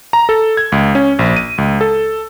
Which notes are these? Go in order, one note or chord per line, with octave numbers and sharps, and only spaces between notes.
A#5
A4
G#6
C#2
C#4
A#1
D#7
C#2
A4